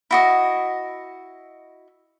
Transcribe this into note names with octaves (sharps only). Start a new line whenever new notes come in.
E4 F#4 D#5